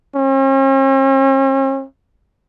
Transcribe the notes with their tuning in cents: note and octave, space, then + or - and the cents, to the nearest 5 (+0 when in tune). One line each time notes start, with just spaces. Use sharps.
C#4 -45